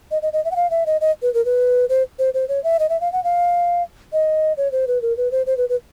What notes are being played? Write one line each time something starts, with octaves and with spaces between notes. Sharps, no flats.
D#5
D#5
D#5
E5
F#5
F5
E5
D#5
D#5
B4
A#4
B4
C5
C5
C5
C#5
E5
D#5
E5
F5
F#5
F5
D#5
C#5
C5
B4
A#4
B4
C5
C5
B4
B4